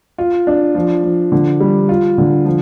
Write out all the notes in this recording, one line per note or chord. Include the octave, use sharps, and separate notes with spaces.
F4
D4
F3
F3
D3
G3
F4
D3
F3